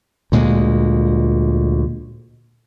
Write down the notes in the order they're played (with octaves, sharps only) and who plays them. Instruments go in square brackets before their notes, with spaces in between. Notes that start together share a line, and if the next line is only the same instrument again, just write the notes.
[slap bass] D2 A#2 G#3